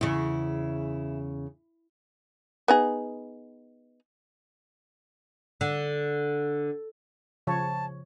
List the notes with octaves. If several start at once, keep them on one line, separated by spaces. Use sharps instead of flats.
E2 C#3 E4
B3 D#4 G#4
D3
C#3 F3 C#5 A5